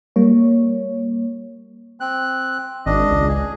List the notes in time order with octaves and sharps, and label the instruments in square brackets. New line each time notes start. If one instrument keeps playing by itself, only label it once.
[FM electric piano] G3 A#3 C#5
[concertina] C4 F#6
[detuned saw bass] G#1 [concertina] D4 D#5
[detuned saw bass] C#2
[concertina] G#4